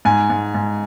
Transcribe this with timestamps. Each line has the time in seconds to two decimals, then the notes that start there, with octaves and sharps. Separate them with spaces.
0.05 G#2 G#5
0.30 G#2
0.54 G#2